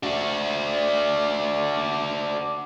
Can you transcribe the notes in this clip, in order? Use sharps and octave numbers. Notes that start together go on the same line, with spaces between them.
D4 F#4